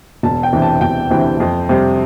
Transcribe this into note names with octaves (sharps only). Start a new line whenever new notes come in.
E1 A5
G5
D2 C3 E3
A5
E1 G5
D2 C3 E3
F2
C3 G3